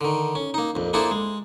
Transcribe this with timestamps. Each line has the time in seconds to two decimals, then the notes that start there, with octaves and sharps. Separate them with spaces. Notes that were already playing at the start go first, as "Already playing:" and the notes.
0.01 D3 D#3
0.35 C#4
0.54 A#3 D#4
0.75 A#1 F2
0.93 A#3 D4 E4 G#4 A4 C5
1.11 G#3